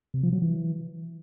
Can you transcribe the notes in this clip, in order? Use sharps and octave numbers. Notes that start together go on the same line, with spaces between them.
C3
F3
F#3
E3